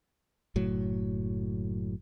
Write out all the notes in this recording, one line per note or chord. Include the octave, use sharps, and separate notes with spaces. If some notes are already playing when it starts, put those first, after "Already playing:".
F#1 A2 F#3